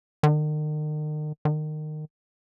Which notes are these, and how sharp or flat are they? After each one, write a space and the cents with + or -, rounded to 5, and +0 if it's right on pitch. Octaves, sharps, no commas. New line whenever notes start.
D#3 -40
D#3 -25